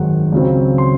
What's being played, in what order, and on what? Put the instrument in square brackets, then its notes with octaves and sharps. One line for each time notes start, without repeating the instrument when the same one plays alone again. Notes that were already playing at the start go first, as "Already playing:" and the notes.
Already playing: [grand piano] G#1 F#2 D#3 G#3 F#5
C#2 C#3 F#3 C4
C6